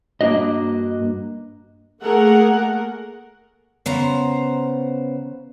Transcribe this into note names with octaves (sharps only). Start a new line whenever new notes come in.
G2 A#3 D4 F#4 D#5
A3 A#3 G#4 A#4 F#5
C#3 B3 C5 A#5